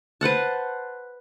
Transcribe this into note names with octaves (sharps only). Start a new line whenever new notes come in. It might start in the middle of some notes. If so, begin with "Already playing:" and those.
B4 C5 F#5 A5